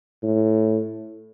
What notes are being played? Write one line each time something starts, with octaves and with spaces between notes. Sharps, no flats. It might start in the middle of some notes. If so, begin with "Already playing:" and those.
A2